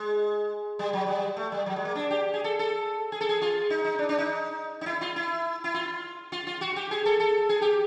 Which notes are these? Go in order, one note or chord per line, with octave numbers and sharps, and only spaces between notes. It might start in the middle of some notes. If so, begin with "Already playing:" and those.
Already playing: G#3
G3
F#3
G3
A3
G3
F#3
G#3
A#3
D4
G4
G#4
A4
A4
G#4
A4
G#4
F4
D#4
D#4
D4
D4
D#4
D#4
E4
F4
E4
E4
F4
F4
F4
F#4
G4
G#4
A4
A4
G#4
G4